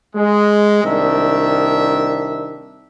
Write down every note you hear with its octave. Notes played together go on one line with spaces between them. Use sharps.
G#3
C2 D#3 D4 E5